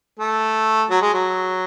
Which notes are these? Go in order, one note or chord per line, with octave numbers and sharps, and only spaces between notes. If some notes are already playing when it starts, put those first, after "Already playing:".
A3
F#3
G#3
F#3